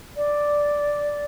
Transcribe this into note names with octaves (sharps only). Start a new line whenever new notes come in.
D5